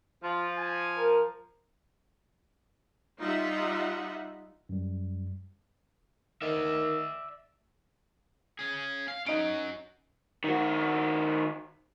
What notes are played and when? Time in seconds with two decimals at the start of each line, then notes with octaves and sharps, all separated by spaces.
0.23 F3 F4
0.58 G#5
0.97 A#4
3.20 G3 D#4 F4 D#5 E5 F#5
4.69 F#2 G3
6.42 D#3 D5 E5
8.59 C#4 G#4
9.08 F5
9.26 C#4 D#4 F#4 D7
10.44 D#3 F#4